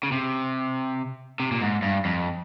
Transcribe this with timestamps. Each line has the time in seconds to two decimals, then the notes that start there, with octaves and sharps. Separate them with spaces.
0.03 C#3
0.12 C3
1.40 C3
1.52 A#2
1.61 G#2
1.82 G2
2.05 F2